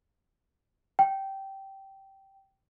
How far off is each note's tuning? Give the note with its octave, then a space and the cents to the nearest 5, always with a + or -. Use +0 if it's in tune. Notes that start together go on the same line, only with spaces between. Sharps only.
G5 -15